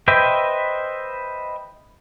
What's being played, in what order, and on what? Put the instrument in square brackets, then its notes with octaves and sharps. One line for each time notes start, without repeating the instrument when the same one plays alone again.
[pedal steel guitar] B4 C5 D#5 E5 G5